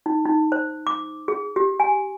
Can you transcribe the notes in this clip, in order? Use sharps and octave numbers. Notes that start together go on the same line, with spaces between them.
D#4
D#4
C5
D6
G#4
G4
G#5